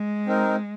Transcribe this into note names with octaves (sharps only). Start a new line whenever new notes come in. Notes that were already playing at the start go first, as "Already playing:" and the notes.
Already playing: G#3
C4 D#4 A#4